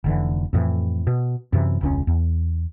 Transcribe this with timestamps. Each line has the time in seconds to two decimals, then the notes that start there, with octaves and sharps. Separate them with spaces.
0.04 F1 D3 E3
0.53 F2 A2 E3
1.07 B2
1.53 F#2 C3 E3
1.81 E1 C#2 C#4
2.07 E2